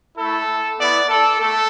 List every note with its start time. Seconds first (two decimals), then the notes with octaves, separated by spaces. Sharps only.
0.16 A3 E4 A4
0.77 B3 E4 D5
1.09 A4
1.39 A3 A4